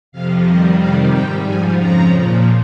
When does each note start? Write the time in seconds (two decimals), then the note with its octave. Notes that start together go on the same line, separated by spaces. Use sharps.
0.12 F2 C3 F3 F5
0.45 F2 D#3 G3 D#5
0.78 F2 C3 D#3 G3 F5
1.11 G#2 G3 G5
1.44 G#2 F3 G#5
1.77 F2 C#3 F3 A#5
2.11 A#2 F3